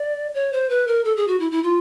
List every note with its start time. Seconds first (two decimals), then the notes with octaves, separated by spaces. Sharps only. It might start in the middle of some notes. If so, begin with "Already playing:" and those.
Already playing: D5
0.34 C#5
0.53 C5
0.70 B4
0.87 A#4
1.05 A4
1.17 G#4
1.28 F#4
1.40 E4
1.51 E4
1.63 F4